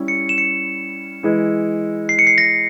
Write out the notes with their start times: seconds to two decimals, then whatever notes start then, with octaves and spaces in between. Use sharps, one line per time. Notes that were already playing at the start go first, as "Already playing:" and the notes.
Already playing: G3 C#4 E4
0.08 C#7
0.29 E7
0.38 C#7
1.23 E3 G#3 E4
2.09 C7
2.19 C#7
2.27 C7
2.38 A#6